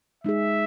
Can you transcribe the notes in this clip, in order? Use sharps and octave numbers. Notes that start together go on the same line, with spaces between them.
G#3 D#4 G#4 E5